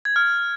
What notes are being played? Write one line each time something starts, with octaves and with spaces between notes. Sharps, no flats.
G#6
F6